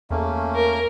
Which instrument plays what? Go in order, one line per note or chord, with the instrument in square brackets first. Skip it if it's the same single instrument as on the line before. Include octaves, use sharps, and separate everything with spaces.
[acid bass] E2 [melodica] A3 A#3 C#4
[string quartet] A#4